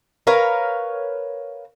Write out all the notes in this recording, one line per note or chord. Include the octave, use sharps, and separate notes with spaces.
A#4 B4 C#5 F5